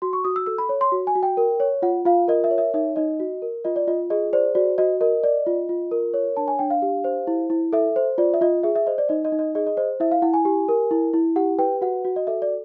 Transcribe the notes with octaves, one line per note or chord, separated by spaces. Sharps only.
F#4 C6
C#6
F#4 D#6
E6
A4 E6
B5
C#5
C6
F#4
G#5
F#4
G5
A#4
C#5
F4 F#5
F4 F5
A#4 D#5
E5
C#5
E5
D#4 E5
D#4 D#5
F#4
A#4
F4 D#5
D5
F4 D#5
G#4 D#5
C5 D5
F#4 D5
F#4 D#5
A#4 D#5
D5
F4
F4
A#4
C#5
D4 A5
G#5
D4 G5
F5
G4
C5
E4
E4
A4 E5
C5
F4 D5
E5
F4 D#5
G#4 E5
E5
C5 D#5
D5
D#4 D#5
D#5
D#4
D#5
G#4 D#5
D#5
C5 D#5
E4 E5
F5
E4 F#5
G#5
G4
A#4
E4
E4
G4 F#5
B4 G5
F#4 F#5
F#4
D#5
A4 E5
D5